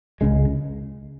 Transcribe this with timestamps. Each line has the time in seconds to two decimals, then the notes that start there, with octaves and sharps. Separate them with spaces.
0.21 C#2 C#3 G#3